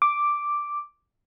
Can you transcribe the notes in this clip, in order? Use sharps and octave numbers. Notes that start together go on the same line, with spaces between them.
D6